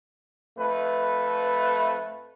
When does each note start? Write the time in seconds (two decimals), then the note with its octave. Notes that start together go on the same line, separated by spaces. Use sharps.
0.57 F2 A3 B4